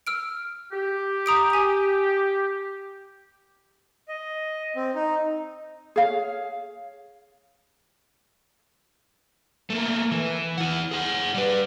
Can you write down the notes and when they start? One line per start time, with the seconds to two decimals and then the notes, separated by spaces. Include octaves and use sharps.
0.07 E6 F6 D7
0.72 G4
1.26 A#5 D#6 D7
1.50 G#5 D#6
4.08 D#5
4.76 C4
4.95 D#4
5.96 G#4 C#5 F5
9.70 A3 A#3
10.11 E3
10.58 E4 F#5
10.91 G#4 F#5
11.34 G3 B4